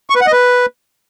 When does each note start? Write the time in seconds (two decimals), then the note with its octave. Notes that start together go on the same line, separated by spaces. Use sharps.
0.10 C#6
0.15 B4
0.21 F#5
0.27 D#5
0.32 B4